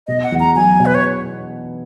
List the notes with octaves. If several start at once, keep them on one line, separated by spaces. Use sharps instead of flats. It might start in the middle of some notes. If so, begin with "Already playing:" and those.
B2 D#5
F#5
E2
A#5
F#3 G#5
B2
B4
C#5